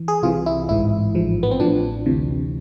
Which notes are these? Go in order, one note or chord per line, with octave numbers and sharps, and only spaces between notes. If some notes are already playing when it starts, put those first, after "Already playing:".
Already playing: E3
G#4
C2 C3 E3 F4
E4
A1 G#2 E3 E4
A1 G#2 F3
B3
C4
A1 A2 F3 D4
D2 C3 E3